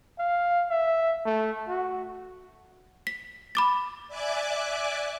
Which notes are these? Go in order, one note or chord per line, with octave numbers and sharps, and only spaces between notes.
F5
E5
A3
F#4
B6
B5 D6 A6
D5 E5 G#5 D6 F#6